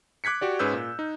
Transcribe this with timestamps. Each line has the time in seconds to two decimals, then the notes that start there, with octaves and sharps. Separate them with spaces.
0.24 D6 F#6 G#6 B6 C#7
0.41 F#4 G4 D5
0.59 G#2 C#4 G#4 B4 E6 G6
0.73 A#2
0.99 D#4